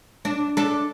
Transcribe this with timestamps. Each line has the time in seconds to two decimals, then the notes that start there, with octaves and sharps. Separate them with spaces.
0.25 D4
0.57 D4 A4